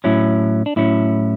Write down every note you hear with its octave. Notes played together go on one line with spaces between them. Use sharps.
A2 F#3 C#4 E4
D4
A2 F#3 C#4 E4